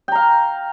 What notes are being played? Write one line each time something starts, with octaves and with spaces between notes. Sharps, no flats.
F5 G5 A#5